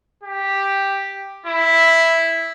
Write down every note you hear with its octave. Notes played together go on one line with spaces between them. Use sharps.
G4
E4